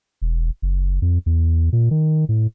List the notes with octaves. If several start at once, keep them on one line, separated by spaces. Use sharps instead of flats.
E1
F#1
F2
E2
A#2
D#3
A2